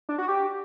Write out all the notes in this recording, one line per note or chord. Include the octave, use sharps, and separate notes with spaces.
D4
F#4
G4